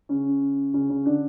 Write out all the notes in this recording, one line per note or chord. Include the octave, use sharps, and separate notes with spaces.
C#3 C#4
C#3 C#4
C#3 C#4
D3 D4